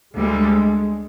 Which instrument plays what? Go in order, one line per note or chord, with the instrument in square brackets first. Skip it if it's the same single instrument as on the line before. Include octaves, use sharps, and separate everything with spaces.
[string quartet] D2 D3 G3 [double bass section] G#3